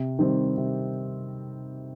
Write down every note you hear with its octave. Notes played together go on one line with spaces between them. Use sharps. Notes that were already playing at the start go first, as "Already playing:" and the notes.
Already playing: C3
D#3 G3 C4
C3